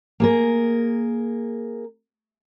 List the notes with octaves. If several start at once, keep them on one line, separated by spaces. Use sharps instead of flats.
A#3 G#4 A#4